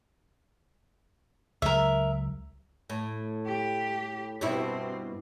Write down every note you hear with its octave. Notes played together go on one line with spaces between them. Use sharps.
C#2 F#3 A#4 E5
A2
G4
G2 B2 C4 E4